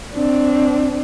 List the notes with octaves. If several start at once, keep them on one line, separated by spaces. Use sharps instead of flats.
C4 D4